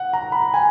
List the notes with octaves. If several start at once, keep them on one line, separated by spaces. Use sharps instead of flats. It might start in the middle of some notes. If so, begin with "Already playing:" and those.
Already playing: F#5
A#5
B5
G#5